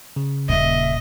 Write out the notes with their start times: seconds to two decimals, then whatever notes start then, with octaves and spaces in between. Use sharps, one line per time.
0.16 C#3
0.49 D#1 A#2 D#5 E5